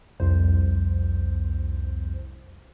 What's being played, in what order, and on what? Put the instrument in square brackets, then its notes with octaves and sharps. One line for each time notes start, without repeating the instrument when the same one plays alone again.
[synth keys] C2 F2 C5